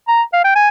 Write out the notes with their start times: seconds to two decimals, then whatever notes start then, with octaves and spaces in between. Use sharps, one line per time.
0.08 A#5
0.33 F5
0.45 G5
0.56 G#5